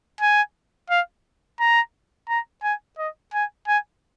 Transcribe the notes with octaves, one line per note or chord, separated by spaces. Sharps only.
G#5
F5
A#5
A#5
G#5
D#5
G#5
G#5